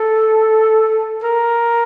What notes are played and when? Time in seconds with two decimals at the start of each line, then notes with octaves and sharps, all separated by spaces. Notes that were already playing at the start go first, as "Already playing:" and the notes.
Already playing: A4
1.24 A#4